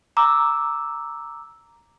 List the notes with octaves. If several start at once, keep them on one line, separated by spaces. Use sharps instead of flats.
A#5 D6 E6